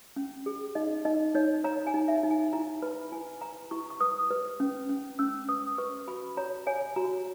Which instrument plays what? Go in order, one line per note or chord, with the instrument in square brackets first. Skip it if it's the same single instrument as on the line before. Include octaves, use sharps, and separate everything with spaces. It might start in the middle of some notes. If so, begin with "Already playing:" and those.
[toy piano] C#4
G#4
D#4 D#5
D#4 D#5
D#4 C#5
C#5 A#5
G#5
D#4
E5
D#4
G#5
E4 A#5
B4 B5
E4 G#5
B4 A#5
E4 C#6
C#6
B4 D#6
B4
C#4
C#4
C#4 E6
B4 D#6
B4 C#6
F#4 B5
C#5 A#5
C#5 G#5
F#4 A#5